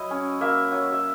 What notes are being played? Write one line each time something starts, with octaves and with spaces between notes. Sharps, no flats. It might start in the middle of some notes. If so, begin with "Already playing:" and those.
Already playing: F#3 E4 D#5
C#4
A#3 E5
F#3
E5